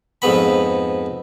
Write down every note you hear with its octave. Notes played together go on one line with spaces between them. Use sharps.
F2 G#2 B3 B5